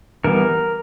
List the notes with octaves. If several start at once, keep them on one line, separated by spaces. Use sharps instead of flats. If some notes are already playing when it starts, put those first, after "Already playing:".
E3 G3 B3 A#4